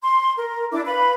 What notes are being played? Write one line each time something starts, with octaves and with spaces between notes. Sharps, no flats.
C6
A#4
D4 E4 D6
B4 F5 B5